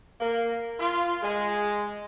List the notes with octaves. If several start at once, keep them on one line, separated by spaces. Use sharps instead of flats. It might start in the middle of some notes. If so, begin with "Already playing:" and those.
A#3
F4
G#3